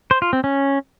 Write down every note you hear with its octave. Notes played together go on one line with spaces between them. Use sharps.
C5
F4
C4
C#4